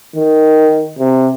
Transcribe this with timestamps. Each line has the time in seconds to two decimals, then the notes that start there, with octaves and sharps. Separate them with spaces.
0.16 D#3
0.99 C3